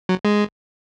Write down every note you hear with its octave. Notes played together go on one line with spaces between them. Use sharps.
F#3
G#3